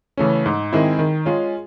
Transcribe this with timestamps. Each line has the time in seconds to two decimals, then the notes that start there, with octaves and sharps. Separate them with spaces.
0.18 C#3 E3 A3 C#4
0.46 G#2
0.73 D#3 G#3 C4 E4
0.99 D#3
1.26 G#3 C#4 F4